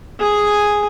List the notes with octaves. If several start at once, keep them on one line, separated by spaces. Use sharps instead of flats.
G#4 G#5